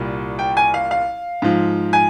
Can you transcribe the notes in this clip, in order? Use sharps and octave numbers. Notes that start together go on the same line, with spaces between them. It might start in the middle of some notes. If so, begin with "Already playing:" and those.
Already playing: C2 A#2 G3
G5
G#5
F5
F5
G#2 F3
G#5